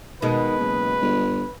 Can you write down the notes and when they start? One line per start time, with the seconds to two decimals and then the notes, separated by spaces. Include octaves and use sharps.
0.22 B2 D#3 G#3 B4
0.59 F#1
1.01 G1